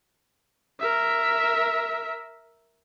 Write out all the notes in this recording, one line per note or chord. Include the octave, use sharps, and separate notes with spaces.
A#4 E5